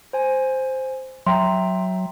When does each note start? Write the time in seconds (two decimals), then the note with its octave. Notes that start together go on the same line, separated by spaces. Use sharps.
0.13 C5 G#5
1.27 F#3 E5 G5 A#5 C6